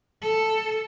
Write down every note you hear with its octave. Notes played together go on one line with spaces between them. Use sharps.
A4